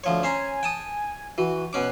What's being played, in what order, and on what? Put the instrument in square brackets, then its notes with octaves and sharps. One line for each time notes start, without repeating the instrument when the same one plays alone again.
[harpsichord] D2 F3 C#5
[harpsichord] C#4 C5 A#5 [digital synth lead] G#5
[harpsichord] G5 A5 D#6
[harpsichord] E3 [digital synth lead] F#4
[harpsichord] B2 C#4 D6 [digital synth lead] F#6